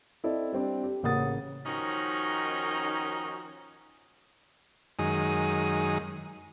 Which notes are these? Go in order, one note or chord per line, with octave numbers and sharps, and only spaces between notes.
C4 E4 A4 D5 D#5
G3 C4 D4
G4
A1 C#3 A#3 F#5 D#6 A6
D#3 F3 C#4 D#4 F#4
F#2 D#3 G#3 D#6